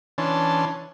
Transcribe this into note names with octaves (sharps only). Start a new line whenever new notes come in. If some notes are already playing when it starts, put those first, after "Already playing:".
E3 C#4 D4 A5 C6